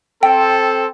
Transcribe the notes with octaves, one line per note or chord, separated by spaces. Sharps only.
C4 A4 G5